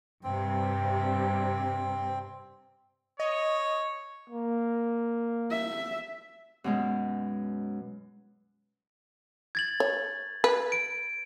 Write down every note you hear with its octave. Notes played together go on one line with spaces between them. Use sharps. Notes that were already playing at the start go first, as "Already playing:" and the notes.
G2 C3 G3 C4
C#5 D#5
A#3
E5
F#2 B2 G#3
G#6 A6 F#7
C#5
B4
D7